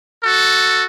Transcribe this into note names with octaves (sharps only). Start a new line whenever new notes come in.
F#4 A4